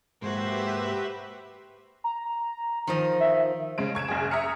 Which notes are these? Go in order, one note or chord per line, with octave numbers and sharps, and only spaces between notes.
G#2 G#3 A#3 F#4 G4 B4 C5 E5
A#5
D#3 F3 D#5
E5
C#3 G#3 D7
C#6 G#6 D7 E7
F#1 G#4
E5 A#5 D#6 F6 C#7